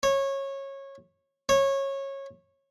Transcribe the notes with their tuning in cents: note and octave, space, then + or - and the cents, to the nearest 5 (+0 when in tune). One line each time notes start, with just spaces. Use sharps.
C#5 -20
C#5 -20